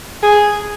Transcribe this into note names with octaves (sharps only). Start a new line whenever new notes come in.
G#4